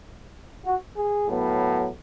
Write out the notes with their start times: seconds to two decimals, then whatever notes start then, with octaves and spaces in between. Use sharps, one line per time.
0.66 F#4
0.96 G#4
1.26 A2 F#3 B3